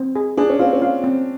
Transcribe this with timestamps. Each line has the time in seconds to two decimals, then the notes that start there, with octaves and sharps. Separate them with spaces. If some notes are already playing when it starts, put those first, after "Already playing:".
Already playing: C4
0.16 G#4
0.37 D4 G#4
0.49 C#4
0.59 C4 F4
0.73 C#4
0.82 F4
1.04 C4